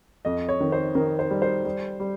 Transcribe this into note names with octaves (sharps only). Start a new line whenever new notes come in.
F2 D#5
C#5
D#3
C5
D#3 A#4
C5
G3
C5
G3
G3